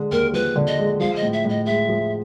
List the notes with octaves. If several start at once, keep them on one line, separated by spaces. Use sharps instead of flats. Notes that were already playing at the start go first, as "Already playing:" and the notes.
Already playing: D3 G#3
D#2 A#4
F3 B4
D3
D#5
G#3
F3 F5
D#5
A2
E5
A2 D#5
G#3 E5
F3